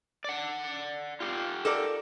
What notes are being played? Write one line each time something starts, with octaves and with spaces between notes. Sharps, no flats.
D5 F#5
F4 G4
A4 A#4 D5